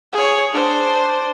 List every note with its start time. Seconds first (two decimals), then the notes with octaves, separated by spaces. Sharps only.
0.13 G#4 C#5
0.53 D4 C5